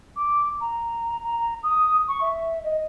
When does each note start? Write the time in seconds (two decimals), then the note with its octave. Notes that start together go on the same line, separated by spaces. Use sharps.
0.16 D6
0.60 A#5
1.23 A#5
1.63 D#6
2.08 C#6
2.21 E5
2.64 D#5